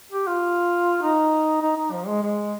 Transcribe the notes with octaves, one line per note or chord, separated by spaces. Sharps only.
G4
F4
D#4
D#4
D#4
F3
G#3
G#3